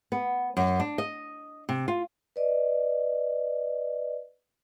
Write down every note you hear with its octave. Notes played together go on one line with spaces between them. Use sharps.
B3
F#2
D4
D#5
C3
F4
B4 D5 D#5